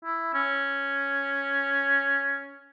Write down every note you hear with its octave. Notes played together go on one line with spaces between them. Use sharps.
E4
C#4